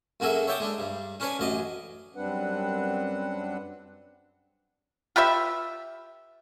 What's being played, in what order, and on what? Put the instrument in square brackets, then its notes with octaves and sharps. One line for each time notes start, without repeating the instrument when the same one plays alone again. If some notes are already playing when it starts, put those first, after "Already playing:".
[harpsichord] F#2 A#3 F#4 G#4 A4 E5
C#5 E5 G5 A5 D6 D#6
G#3 D4
G2
C#4 D4 B4 C#5 G#5
A1 F#2 D#5 D6
[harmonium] F#2 G3 C4 D4 B4 F#5
[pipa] F4 G4 B4 E5